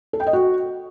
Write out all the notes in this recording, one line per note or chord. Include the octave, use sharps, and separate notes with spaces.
A4
G5
D#5
F#4